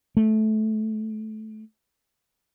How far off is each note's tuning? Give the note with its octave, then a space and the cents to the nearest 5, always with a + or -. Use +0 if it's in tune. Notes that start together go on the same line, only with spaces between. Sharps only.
A3 -20